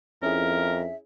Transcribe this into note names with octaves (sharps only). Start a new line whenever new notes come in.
F2 C#4 E4 G#4 A#4 E5